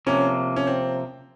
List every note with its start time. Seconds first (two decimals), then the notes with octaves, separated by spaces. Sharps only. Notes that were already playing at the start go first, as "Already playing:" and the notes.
0.07 C3 F3 A#3 C#4
0.56 C#4
0.67 C4